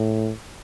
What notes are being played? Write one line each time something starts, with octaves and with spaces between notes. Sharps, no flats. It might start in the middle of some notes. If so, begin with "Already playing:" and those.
Already playing: A2